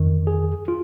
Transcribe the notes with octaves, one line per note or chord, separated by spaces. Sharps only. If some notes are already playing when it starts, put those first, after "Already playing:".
Already playing: F2 D#3
G#4
F4